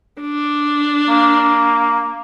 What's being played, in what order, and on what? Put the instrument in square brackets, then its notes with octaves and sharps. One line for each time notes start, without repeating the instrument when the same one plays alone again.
[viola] D4
[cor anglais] A#3